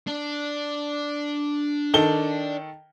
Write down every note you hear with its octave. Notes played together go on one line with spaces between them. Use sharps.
D4
D#3 A4 G7